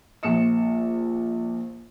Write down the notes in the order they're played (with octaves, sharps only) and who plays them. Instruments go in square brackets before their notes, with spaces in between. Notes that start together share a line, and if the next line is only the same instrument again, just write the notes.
[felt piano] A#1 A#2 C#7 E7